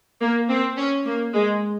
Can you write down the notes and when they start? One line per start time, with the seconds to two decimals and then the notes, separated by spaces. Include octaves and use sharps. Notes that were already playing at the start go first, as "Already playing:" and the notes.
0.21 A#3
0.49 C4
0.77 C#4
1.05 A#3
1.33 G#3